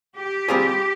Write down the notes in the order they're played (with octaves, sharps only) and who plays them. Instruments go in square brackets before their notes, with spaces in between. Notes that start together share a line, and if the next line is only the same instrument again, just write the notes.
[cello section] G4
[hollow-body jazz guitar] G3 C4 F4 G#4 C5